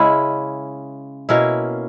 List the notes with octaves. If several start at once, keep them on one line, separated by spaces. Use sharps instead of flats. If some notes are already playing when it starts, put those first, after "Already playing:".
Already playing: C#3 G#3 C#4 E4 B5
B2 A#3 C#4 E4